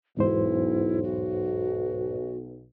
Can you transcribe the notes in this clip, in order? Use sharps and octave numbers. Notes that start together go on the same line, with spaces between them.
B1 E2 G#2 E4 C5
F#4